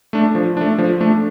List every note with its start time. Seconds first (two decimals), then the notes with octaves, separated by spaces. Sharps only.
0.13 A3 D4
0.35 F3
0.57 A3 D4
0.78 F3
1.00 A3 D4